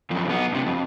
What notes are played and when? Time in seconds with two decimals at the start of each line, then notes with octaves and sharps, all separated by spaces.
0.10 F#2 F3
0.27 B1 B3
0.52 G2 C3
0.66 F2